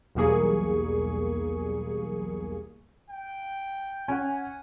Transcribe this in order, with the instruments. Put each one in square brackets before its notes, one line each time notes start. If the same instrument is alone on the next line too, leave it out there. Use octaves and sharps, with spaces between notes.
[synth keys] B1 E2 G3 A#3 G#4 C#6
[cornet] G5
[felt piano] C#4 [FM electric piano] F#5 G#5